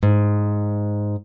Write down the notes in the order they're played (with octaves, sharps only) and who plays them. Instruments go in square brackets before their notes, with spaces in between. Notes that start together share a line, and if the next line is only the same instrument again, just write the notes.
[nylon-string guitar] G#2